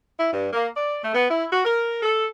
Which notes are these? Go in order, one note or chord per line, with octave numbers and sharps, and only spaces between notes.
E4
G2
A#3
D5
A3
B3
E4
F#4
A#4
A4